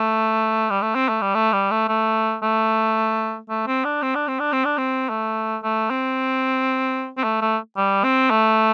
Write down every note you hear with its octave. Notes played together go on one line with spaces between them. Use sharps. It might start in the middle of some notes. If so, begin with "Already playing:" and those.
Already playing: A3
G3
A3
C4
A3
G3
A3
G3
A3
A3
A3
A3
C4
D4
C4
D4
C4
D4
C4
D4
C4
A3
A3
C4
C4
A3
A3
G3
C4
A3